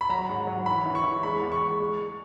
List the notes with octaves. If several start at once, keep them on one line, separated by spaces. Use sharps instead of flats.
B5
F#3 A#5
G#2
F#3
E3 B5
E3
C#6
E3
G#3 B5
E2
C#6
G#3
G#3
G#3